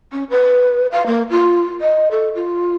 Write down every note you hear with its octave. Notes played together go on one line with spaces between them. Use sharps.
C#4
B4
F5
A#3
F4
D#5
A4
F4